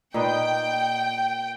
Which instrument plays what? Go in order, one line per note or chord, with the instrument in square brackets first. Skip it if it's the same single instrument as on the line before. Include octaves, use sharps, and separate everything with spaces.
[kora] A#2 D#4 B4 [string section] G5